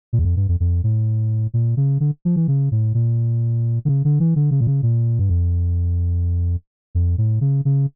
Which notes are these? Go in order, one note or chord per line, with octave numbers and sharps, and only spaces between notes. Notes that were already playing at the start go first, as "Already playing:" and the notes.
A#2
E2
F2
G2
F2
F2
A2
A#2
C#3
D3
F3
E3
C#3
A2
A#2
D3
C#3
D3
E3
D3
C#3
A#2
C#3
A#2
G2
F2
F2
A2
C#3
C#3